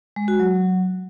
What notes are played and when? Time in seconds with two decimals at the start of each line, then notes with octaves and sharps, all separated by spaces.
0.16 G#3
0.28 F#4
0.40 F#3